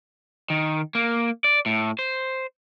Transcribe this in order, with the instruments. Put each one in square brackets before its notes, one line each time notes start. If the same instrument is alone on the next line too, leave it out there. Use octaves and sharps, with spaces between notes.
[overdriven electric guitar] D#3
A#3
D5
A2
C5